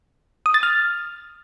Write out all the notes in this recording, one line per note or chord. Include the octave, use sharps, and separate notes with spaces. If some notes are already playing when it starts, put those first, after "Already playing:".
D#6
A6
F6